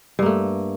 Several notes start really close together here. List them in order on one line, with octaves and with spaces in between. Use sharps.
G2 A#3 A3